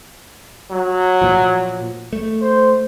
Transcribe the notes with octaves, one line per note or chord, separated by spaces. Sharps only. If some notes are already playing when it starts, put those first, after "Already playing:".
F#3
A#2 F3
A3
C5